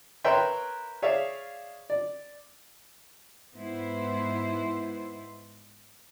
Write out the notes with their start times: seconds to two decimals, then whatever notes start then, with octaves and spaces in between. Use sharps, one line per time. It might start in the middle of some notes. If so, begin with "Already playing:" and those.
0.24 A#4 B4 C#5 E5 G5 C6
1.02 G#4 C#5 D5 E5 F5
1.90 D5
3.55 G#2 B3 E4 C5